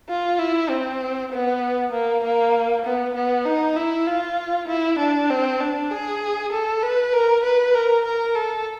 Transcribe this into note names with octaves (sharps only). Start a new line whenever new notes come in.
F4
E4
C4
B3
A#3
A#3
B3
B3
D#4
E4
F4
E4
D4
C4
D4
G#4
A4
B4
A#4
B4
A#4
A#4
A4